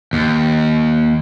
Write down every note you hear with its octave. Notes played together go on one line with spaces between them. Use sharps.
D#2